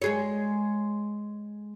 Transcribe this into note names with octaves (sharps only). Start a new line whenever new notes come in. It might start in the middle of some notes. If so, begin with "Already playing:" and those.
G#3 G#4 C#5